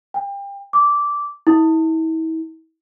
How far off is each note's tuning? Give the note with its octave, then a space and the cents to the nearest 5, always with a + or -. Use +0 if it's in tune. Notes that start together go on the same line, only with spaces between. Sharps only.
G5 +30
D6 -10
E4 -40